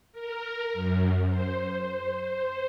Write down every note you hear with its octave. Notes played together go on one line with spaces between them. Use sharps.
A#4
F#2
C5